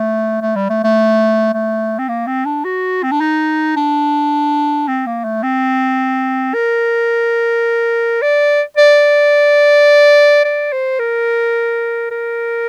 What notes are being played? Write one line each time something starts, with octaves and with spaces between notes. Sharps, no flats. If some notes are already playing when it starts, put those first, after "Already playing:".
Already playing: A3
A3
G3
A3
A3
A3
C4
A#3
C4
D4
F#4
C4
D4
D#4
D4
C4
A#3
A3
C4
A#4
D5
D5
D5
C5
A#4
A#4